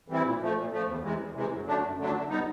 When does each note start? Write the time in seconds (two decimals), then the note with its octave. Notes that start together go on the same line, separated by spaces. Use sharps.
0.08 E3 G3 C4 E4
0.24 A#2
0.41 F3 A3
0.55 A#2
0.72 F3 A3
0.87 E2
1.03 C3 E3 G#3
1.20 E2
1.35 C3 E3 G#3
1.51 F#2
1.66 D3 F#3 A3 D4
1.82 F#2
1.98 D3 F#3 A3 D4
2.14 D3
2.29 G3 B3 D#4